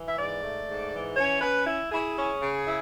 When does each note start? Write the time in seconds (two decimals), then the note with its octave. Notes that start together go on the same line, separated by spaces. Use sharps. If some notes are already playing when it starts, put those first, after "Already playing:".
Already playing: E3
0.08 E5
0.17 G#2 D5
0.42 A3
0.67 G#2
0.92 E3
1.17 C#4 C#5
1.41 C#4 B4
1.66 E4
1.91 E4 G#4
2.16 C#4 G#4
2.41 C#3
2.66 E4